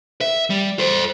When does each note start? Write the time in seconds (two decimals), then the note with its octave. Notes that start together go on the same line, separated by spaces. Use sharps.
0.21 E5
0.50 G3
0.79 A4 C5